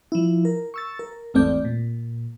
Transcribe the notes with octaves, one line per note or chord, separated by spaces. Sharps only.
F3 E4
A#4
C#6 E6 A6
A#4
G#1 E2 A3 C4 D5 G6
A#2